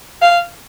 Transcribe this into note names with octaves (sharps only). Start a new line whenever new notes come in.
F5